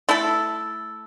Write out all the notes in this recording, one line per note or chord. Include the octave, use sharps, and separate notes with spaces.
A3 E4 A4